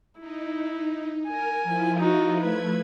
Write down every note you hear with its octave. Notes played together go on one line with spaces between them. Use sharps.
D#4 E4
A#4 G#5
F3 E4 F4
D#4 F#4
F3 A3 B4 G#6